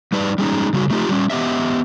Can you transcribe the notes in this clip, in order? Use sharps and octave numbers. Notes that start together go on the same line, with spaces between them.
G3 D#4 B4 D5
G3 G#3 C#4 D#4
C#3 G3 F#4
F#3 A3 D#4 F4 G4
G3 C#4
B3 G4 D#5 E5